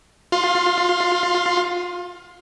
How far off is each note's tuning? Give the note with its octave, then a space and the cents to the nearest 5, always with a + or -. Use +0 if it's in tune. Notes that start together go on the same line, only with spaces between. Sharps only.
F4 +30 F5 +0 C6 +0